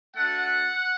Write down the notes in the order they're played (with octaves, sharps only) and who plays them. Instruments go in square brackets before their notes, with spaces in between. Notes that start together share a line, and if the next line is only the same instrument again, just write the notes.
[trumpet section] A3 D4 F#4 F#5